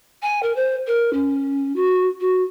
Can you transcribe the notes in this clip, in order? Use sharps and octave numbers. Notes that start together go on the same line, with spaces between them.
G#5
A#4
C5
A#4
C#4
F#4
F#4